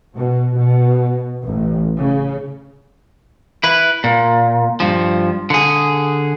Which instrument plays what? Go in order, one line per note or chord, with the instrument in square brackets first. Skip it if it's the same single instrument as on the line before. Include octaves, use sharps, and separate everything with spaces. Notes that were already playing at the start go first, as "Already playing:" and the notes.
[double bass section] B2
B2
A1
C#3
[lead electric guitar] E4 B4
A#2
G2 F3
D3 G#4